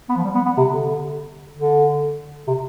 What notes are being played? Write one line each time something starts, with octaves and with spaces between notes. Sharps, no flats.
B3
F3
G3
B3
B3
C3
D3
D3
C3